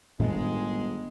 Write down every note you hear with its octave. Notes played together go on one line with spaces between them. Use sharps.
G1 A2 D#3 G#3 B3